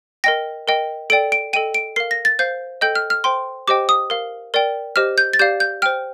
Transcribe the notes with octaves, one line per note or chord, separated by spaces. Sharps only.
A#4 D#5 G5 A#6
A#4 D#5 G5
A4 D5 G5 D7
D7
A4 D#5 G5 D#7
D7
A#4 F5 C7
A#6
A6
C5 F5 G6
A4 D#5 G5 G6
F6
F6
C5 G5 C6
G4 C5 D#5 G5 D6
D#6
A#4 F5
A#4 D5 G5
G4 C5 D#5 F6
G6
A6
G4 D5 F5 G6
G6
C5 G5 F6